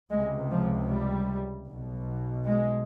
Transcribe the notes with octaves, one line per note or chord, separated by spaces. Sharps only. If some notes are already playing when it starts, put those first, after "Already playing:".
C#2 C3 G#3
F3
G3
B1 B2
G#3